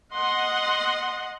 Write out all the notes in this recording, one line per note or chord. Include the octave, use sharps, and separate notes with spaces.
D#5 F#5 C6